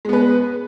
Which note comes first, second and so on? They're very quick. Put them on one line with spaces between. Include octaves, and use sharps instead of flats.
G#3 B3 B4